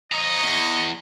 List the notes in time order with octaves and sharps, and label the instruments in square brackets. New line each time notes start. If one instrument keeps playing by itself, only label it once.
[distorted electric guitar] F2 A#5 [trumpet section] C#5 D#5
[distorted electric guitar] E2